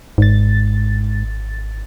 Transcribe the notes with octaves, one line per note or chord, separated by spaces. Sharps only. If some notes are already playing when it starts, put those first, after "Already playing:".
G#1 G#2 A6